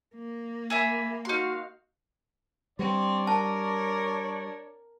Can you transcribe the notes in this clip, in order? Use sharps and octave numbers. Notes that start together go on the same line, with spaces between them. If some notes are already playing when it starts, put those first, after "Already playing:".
A#3
G#4 E5 B5
D#4 F#4 F5 C6
G3 C4 D4 C#5 D5
A#4 A5